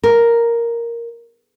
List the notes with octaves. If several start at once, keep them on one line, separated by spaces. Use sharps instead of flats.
A#4